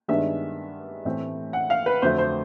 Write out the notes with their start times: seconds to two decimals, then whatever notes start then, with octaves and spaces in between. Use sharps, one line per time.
0.08 G2 D#3 G#3 B3 D4 E5
1.05 A2 E3 A3 C4
1.53 F#5
1.70 F5
1.86 B4
2.02 F2 D3 F#3 A3 C5
2.18 C5